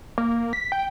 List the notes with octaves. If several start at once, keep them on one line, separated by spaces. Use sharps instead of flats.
A#3
B6
G5